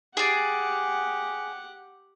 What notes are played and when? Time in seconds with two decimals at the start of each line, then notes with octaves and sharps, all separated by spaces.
0.17 G4 G#4 D5 F#5